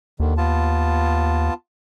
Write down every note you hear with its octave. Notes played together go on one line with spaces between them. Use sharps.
D#2 D3 D#3
B3 F4 A5